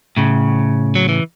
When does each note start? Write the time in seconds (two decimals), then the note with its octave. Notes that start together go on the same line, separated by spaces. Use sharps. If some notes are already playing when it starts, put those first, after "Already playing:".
0.17 A2 C#3
0.95 F#3
1.09 E3